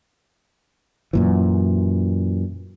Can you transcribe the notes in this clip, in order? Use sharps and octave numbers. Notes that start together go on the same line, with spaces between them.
F#2 A#2 E3